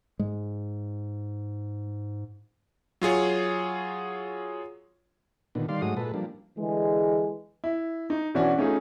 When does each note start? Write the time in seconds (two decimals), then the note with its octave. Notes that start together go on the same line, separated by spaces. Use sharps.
0.19 G#2 G#3
3.02 F#3 F4 G#4 C#5
5.55 A#2 D3 D#3 B3
5.69 D#3 G3 D5 F5 C6
5.82 G#2 F#3 G#3 A3 F#4 D#6
5.97 A#2 G#3 A4 B4
6.14 F3 G3 A#3 D4
6.58 D3 E3 G#3
7.64 E4
8.10 D#4
8.34 B2 E3 C#4 D4 F#4
8.57 A3 C#4 D#4 F4 G#4